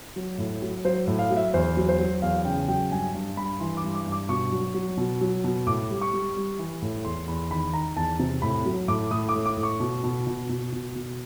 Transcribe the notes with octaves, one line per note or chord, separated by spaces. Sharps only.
F#3
A2
F#3
F#3 C5
A2
F5
F#3
E5
E2 C5
F#3
C5
F#3
E2 F5
C#3 G5
F#3 G5
G2 G#5
G2
G2 B5
E3 C6
D6
G2
D6
G2
D6
B2 C#6
F#3
F#3
B2
F#3
B2
A2 D6
G3
C#6
G3
G3
E3
A2
E2 C6
E2 B5
D#3 B5
D#3 A#5
E2 A5
C3
A2 B5
F#3
A2 D6
A2 D#6
D6
A2
D6
A2
C#6
B2
B2
B2
B2
B2
B2